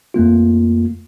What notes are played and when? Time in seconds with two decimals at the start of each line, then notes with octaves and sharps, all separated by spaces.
0.14 F2 A3 A#3 F4